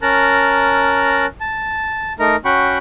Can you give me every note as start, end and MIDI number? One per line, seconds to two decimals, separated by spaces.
0.02 1.26 61
0.02 1.26 70
0.02 1.26 81
0.02 1.26 82
0.02 1.26 90
1.40 2.13 81
2.20 2.36 57
2.20 2.36 63
2.20 2.36 70
2.20 2.36 82
2.45 2.78 61
2.45 2.78 66
2.45 2.78 78
2.45 2.78 79
2.45 2.78 83
2.45 2.78 85